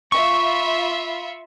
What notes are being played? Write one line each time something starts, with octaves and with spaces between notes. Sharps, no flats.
F4 E5 B5 C#6